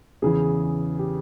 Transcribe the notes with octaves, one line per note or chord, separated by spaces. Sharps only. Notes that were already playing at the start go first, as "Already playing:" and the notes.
E2 C#3 E3 G#4
G4